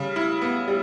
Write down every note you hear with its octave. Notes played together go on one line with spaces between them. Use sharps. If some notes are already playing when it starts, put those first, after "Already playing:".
Already playing: C#3 G3
E4
B3
G3